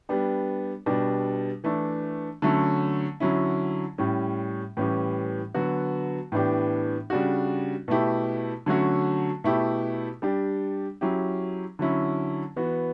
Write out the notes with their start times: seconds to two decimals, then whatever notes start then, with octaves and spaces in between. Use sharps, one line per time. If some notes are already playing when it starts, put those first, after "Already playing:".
0.09 G3 B3 D4 G4
0.86 B2 G3 D4 G4
1.64 E3 A3 D4
2.42 D3 F#3 A3 C#4
3.20 D3 F#3 C#4 E4
3.98 A2 G3 C#4
4.77 A2 E3 G3 C#4 G4
5.54 D3 F#3 B3 F#4
6.32 A2 E3 B3 D4 G4
7.10 C#3 G3 D4 F#4
7.88 B2 A3 E4 G4
8.66 D3 F#3 A3 C#4 F#4
9.44 B2 A3 E4 G4
10.22 G3 D4 G4
11.01 F#3 C#4 E4 G4
11.79 D3 F#3 C#4 E4
12.56 E3 B3 F#4